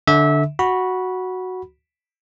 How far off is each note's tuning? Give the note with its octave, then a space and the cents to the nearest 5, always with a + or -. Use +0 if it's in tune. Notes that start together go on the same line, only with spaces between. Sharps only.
D3 +0 E5 -25
F#4 +0 B5 -15